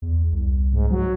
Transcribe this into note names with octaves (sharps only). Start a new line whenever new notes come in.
E2
C2
G#2
F#3